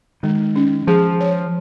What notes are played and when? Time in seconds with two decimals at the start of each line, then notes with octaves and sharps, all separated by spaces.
0.23 D#3 G#3
0.56 C#4
0.87 F3 G#4
1.21 C#5